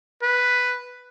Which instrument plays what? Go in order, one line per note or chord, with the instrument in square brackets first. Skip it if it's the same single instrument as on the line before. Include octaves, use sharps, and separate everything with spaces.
[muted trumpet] B4